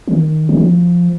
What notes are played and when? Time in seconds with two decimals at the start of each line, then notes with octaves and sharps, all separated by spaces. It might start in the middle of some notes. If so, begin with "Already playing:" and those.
0.08 D#3
0.49 D#3
0.57 F3